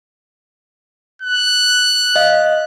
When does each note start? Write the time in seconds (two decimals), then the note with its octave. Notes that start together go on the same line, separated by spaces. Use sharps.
1.22 F#6
2.16 D#5 F5